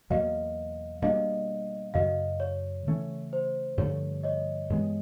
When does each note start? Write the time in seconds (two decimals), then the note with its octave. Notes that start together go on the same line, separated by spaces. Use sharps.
0.10 E2 B2 F#3 A#3 D#5 F5
1.02 B2 G3 A#3 D4 D#5 F5
1.94 F#2 C#3 F#3 D#5 F5
2.40 C#5
2.86 C#3 E3 A3 C#4
3.33 C5
3.78 G2 D3 F3 A3 C#5
4.23 C#5 D#5
4.70 G2 E3 G#3 B3